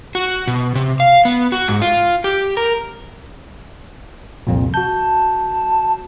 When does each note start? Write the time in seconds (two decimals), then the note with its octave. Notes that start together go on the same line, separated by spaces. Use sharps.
0.15 F#4
0.47 B2
0.75 C3
1.00 F5
1.25 B3
1.52 F#4
1.68 G#2
1.82 F4
2.24 G4
2.57 A#4
4.47 C2 F2 A#2
4.74 F#4 A5 G6